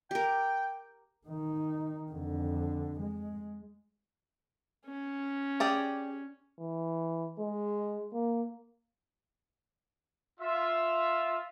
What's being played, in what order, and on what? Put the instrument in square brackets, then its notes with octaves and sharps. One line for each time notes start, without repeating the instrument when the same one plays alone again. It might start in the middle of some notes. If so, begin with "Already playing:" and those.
[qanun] G4 A#4 [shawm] G5
[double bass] D#3 D#4
F2 D3
G#3
[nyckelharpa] C#4
[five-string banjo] G4 G#4 D5
[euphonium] E3
G#3
A#3
[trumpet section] F4 E5